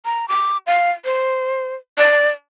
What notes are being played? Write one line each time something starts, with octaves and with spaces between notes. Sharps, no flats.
A#5
D6
F5
C5
D5